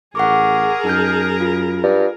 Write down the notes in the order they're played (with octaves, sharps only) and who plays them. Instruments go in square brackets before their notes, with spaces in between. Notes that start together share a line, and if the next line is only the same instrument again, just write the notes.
[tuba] A1 [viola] G#4 A#4 [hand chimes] F#5 C#6 D6
[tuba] F#2 [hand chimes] D#4 F6 G6
[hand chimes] F4
[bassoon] G2